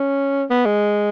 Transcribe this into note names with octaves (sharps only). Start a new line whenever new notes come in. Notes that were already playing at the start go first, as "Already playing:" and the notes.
Already playing: C#4
B3
G#3